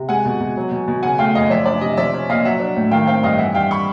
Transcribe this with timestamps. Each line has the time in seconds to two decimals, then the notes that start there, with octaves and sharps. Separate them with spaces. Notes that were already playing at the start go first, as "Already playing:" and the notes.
Already playing: C3
0.09 G#3 F#5 G#5
0.25 B2
0.40 B2
0.57 F#3
0.71 B2
0.88 B2
1.03 C#3 F#5 G#5
1.18 A3 F5 G5
1.35 F#2 D#5 F5
1.50 F3 D5 E5
1.66 D4 D5
1.81 C3 D#5
1.97 F3 D5 E5
2.13 C#4
2.29 A#2 D#5 F5
2.44 F#3 E5 F#5
2.60 D4
2.76 A2
2.91 D#3 F5 G5
3.07 C4 F5 G5
3.23 G2 D#5 F5
3.38 E3 E5 F#5
3.55 G2 F5 G5
3.71 B5 C#6